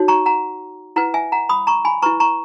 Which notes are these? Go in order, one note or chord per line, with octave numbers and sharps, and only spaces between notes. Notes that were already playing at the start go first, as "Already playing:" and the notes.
Already playing: D#4 F#4 C#5
A#5 C#6
F#5 A#5
E4 B4 F#5 A#5
E5 G#5
F#5 A#5
B5 D#6
A#5 C#6
G#5 B5
E4 B4 A#5 C#6
A#5 C#6